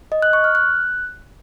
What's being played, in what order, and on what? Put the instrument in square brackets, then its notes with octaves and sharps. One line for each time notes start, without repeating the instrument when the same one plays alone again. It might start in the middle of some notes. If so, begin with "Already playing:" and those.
[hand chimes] D#5
F#6
C#6
F6
F#6